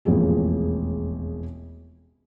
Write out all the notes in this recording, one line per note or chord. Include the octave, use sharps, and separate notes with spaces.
E1 A1 F2 A#3 G#4